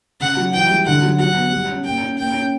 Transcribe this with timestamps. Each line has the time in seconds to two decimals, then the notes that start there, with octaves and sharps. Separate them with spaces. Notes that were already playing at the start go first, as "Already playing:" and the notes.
0.20 C#3 F#5
0.37 F#3
0.53 E3 G5
0.70 G3
0.86 D3 F#5
1.02 F#3
1.19 F#3 F#5
1.36 B3
1.52 G3
1.69 C#4
1.84 A#3 G5
2.01 C#4
2.18 A#3 G5
2.34 C#4